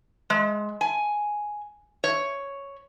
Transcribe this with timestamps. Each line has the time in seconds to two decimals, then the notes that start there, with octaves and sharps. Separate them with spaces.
0.30 G#3
0.81 G#5
2.04 C#5